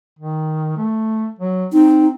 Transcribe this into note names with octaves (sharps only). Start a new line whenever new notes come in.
D#3
A3
F#3
C4 D#4